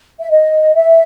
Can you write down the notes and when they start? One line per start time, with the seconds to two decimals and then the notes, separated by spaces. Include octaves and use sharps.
0.20 E5
0.29 D#5
0.74 E5